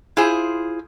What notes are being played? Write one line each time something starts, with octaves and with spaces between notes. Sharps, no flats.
E4 F4 G#4 C5